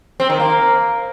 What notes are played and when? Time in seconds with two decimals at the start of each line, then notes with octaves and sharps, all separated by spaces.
0.20 C4
0.30 D#3
0.40 A#3